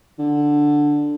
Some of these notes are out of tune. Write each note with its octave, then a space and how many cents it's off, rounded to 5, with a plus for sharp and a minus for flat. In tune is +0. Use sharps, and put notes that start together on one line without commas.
D3 +5